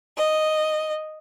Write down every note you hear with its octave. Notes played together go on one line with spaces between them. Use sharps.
D#5